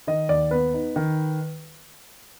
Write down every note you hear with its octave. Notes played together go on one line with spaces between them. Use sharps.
D#3 D#5
D#2 D5
B3 B4
D#4
D#3